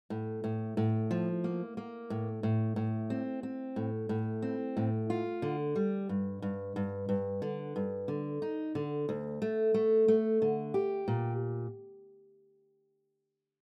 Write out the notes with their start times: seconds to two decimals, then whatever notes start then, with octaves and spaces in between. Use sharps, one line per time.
0.10 A2
0.44 A2
0.77 A2
1.11 F3
1.44 A#3
1.77 A#3
2.10 A2
2.43 A2
2.76 A2
3.10 C4
3.43 C4
3.76 A2
4.09 A2
4.42 C4
4.77 A2
5.10 F4
5.42 D3
5.76 G3
6.09 G2
6.42 G2
6.76 G2
7.09 G2
7.42 D3
7.76 G2
8.08 D3
8.42 D#4
8.75 D3
9.09 D2
9.42 A3
9.74 A3
10.08 A3
10.42 D3
10.74 G4
11.08 A#2